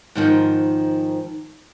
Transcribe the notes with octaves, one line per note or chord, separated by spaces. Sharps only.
G#2 D#3 F3